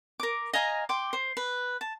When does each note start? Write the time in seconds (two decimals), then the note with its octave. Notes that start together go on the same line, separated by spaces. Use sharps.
0.20 A#4 D6
0.53 D#5 F5 G#5 A#5
0.89 G5 C6 D6
1.13 C5
1.37 B4
1.81 A5